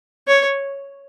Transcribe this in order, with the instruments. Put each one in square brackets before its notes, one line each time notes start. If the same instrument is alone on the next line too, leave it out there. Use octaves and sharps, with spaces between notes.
[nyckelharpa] C#5